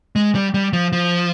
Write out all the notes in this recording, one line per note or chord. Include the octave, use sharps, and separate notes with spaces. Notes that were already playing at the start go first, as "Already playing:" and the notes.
G#3
G3
G3
F3
F3